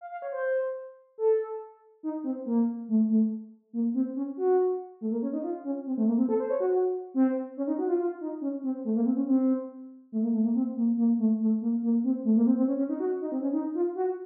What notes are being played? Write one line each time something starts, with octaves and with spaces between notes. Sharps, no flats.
F5
F5
C#5
C5
A4
D#4
C4
A#3
A3
A3
A#3
C4
C#4
F#4
A3
A#3
C#4
D#4
F4
C#4
C4
A3
A#3
C4
A4
C5
C#5
F#4
F#4
C4
C#4
D#4
F#4
F4
F4
D#4
C#4
C4
A3
A#3
C4
C#4
C4
A3
A#3
A3
A#3
C4
A#3
A#3
A3
A3
A#3
A#3
C4
A3
A#3
C4
C4
C#4
C#4
D#4
F#4
D#4
C4
C#4
D#4
F4
F#4